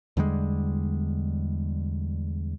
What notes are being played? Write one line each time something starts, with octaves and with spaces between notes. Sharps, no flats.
E2 D3 G3 G#3